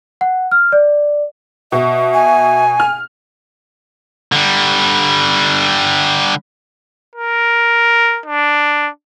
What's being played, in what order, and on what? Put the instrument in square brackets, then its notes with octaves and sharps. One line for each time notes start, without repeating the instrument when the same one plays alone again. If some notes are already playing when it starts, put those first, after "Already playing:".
[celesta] F#5
F6
D5
[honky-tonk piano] B2 [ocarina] E5
[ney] G#5
[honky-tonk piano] F6
[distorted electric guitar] D3 G3
[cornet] A#4
D4